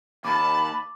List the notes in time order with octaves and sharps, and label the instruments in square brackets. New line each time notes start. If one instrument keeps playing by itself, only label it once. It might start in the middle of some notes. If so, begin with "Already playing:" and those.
[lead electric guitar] D#2 [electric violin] A5 [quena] B5 [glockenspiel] D6